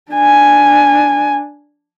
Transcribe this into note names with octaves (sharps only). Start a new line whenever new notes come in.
D4 G#5